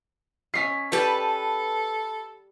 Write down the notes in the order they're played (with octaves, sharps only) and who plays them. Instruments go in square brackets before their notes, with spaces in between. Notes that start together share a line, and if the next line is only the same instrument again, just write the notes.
[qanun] C#4 D#5 [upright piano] B6 C7
[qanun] G3 G5 [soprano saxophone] A4 [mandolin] B4 A5